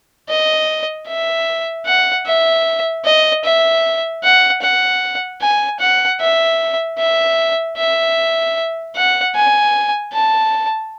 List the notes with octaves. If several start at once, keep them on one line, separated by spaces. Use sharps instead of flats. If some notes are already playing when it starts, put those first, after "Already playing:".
D#5
E5
F#5
E5
D#5
E5
F#5
F#5
G#5
F#5
E5
E5
E5
F#5
G#5
A5